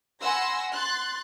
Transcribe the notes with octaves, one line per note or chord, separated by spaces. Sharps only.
F#5 G#5 B5 C6 E6 A#6
C6 F#6 A6